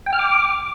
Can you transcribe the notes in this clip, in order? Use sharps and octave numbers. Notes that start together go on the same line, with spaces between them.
G5
F6
D6